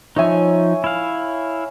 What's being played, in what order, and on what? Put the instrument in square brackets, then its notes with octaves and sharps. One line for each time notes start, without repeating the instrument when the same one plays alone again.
[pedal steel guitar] F3 D#4 [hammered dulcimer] C#5 E5 G#5
[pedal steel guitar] E4 F5